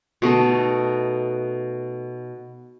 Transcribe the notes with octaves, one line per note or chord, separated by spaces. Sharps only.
B2 A3 D#4 A4